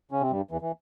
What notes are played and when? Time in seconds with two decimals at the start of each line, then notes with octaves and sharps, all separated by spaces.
0.11 C#3 C#4
0.21 C3 C4
0.31 G2 G3
0.51 E2 E3
0.61 E3